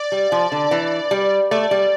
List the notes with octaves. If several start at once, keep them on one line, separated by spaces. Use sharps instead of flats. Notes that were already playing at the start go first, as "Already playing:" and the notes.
Already playing: D5
G3
F3
D3
E3
G3
A3 D5
G3